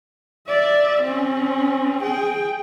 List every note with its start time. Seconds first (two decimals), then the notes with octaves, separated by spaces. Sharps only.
0.48 D5 E5
1.02 C4 C#4
2.03 G#4 G5